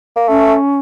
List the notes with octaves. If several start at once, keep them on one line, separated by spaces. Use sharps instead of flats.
A#3
A3 C#4